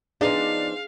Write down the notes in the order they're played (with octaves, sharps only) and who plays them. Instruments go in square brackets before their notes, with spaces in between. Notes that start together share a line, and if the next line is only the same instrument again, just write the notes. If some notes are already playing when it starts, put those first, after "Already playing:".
[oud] F3 B3 D#4 [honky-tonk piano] D4 [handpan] G#4 [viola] F5